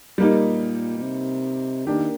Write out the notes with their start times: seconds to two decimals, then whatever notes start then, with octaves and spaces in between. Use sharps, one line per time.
0.18 A#2 G3 A#3 D#4
0.98 A#2
1.02 C3
1.86 D#3 A#3 D4 G4